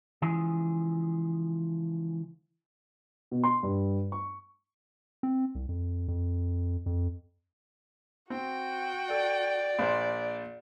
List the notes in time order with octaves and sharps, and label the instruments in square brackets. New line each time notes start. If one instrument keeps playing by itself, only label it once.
[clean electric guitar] C#2 E3 F3 G#4
[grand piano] B2
C6
G2
C#6
[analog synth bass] C4
C2
F2
F2
F2
[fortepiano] C4 [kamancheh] F#4 G5
[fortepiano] A4 [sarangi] D5
[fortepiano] A#1 C5